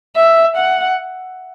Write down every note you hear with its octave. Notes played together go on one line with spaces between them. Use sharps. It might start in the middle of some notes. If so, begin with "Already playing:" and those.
E5
F#5